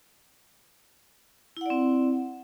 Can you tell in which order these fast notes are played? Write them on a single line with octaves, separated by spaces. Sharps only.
E4 F#5 D5 C4